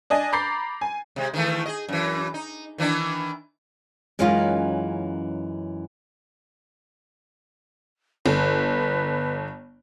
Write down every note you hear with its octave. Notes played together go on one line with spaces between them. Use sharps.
D4 D#5 G#5
A#5 B5 D6 G6 A6 C7
G#5
C3 G#3
D#3 E3 A3
G#4 D#5
F#2 E3
D#4
D#3 E3 D4
F#2 E3 G#3 C#4 D#4 F4
G1 B4